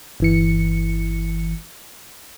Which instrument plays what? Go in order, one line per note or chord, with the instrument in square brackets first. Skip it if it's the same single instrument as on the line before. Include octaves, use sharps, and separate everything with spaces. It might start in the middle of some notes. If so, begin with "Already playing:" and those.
[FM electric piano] G1 E3 C#7